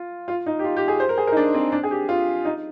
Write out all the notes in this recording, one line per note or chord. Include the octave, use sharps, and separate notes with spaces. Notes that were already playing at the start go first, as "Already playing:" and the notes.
Already playing: F4
F4
D#4
G4
F4
G4
G#4
C5
A#4
G#4
A#4
D#4
D4
C4
D4
G#4
G4
F4
D#4